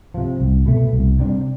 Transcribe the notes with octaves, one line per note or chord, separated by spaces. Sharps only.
C3 F3
C2
B2 A3
C2
C3 G3 D4